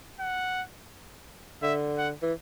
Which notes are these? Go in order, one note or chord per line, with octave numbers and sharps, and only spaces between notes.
F#5
D3 E5
F#5
E3